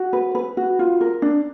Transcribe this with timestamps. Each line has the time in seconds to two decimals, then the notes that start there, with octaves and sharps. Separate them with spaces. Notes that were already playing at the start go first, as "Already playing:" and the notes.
Already playing: F#4
0.13 B4
0.35 B4
0.57 F#4
0.79 F4
1.01 A#4
1.22 D4